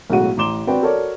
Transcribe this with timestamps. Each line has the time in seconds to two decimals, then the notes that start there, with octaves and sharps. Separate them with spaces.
0.10 B1 A2 G#3 F#4 F#5 D#7
0.37 A1 A#5 C6 D6 E7 G7
0.67 C4 F#4 B4 D5 G5
0.82 F#4 A4 A#4 C#5 D5